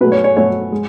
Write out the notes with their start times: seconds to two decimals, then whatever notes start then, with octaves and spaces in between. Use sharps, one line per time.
0.01 B2 F#3 A3 B4
0.12 C#5
0.24 C#5
0.36 B2 F#3 A3 C#5
0.72 G#3